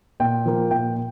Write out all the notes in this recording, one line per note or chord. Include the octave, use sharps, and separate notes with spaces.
A#2 G5
F3 A#3
A#2 G5